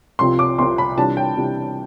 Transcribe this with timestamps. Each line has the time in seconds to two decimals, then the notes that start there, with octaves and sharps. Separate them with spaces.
0.19 C2 C3 F3 C4 C6
0.39 D6
0.58 C2 C3 F3 C4 C6
0.78 B5
0.97 C3 E3 G3 D4 A5
1.17 G5
1.37 C3 E3 G3 D4